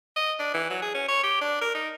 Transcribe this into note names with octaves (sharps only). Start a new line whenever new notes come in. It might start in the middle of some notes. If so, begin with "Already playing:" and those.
D#5
D4
E3
F#3
G#4
C#4
C#5
G4
D4
A#4
D#4